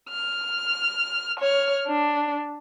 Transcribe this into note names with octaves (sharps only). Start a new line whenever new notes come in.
F6
C#5 F6
D4